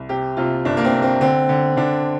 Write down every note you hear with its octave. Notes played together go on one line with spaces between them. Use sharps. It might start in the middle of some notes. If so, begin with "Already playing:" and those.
Already playing: C2
C3 G4
C3 F4
G1 D4
A#3
C4
C3
C4
D3 C4
D3
D3 D4